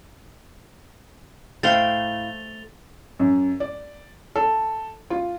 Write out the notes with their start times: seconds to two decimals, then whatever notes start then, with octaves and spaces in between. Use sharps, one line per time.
1.63 A2 A3 C5 F5 G5 A6 F7 G7
3.20 F#2
3.60 D5
4.35 A4
5.10 F4